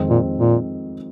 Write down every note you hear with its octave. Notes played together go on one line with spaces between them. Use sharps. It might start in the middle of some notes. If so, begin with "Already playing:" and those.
Already playing: F2 D#3 G#3 C4 D#4
A#2
A#2